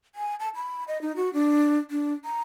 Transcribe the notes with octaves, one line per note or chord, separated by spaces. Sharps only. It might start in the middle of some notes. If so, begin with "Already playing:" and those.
G#5
A5
B5
D#5
D#4
F#4
D4
D4
A#5